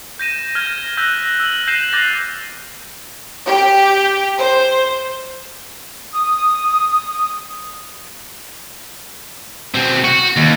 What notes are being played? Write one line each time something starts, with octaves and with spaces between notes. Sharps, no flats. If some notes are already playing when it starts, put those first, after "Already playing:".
G6 A#6 D#7 E7
F6 G#6 A#6 E7 G7
E6 F#6 G6 A#6 B6
E6 F#7
G6 A#6 C7 D#7 E7 G7
D6 F#6 G6 A6 A#6 F7
G4
C5
D#6
B2 C4
F#4
D#2